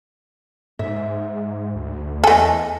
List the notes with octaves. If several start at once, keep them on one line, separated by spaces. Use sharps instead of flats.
G#2 E5
D2
E2 A3 A4 D#5 G#5